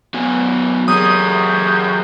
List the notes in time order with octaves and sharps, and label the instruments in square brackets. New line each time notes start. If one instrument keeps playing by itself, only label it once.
[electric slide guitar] F#3 B3 G#5
[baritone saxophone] F#2 [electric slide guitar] F#3 G4 G#4 [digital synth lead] D#6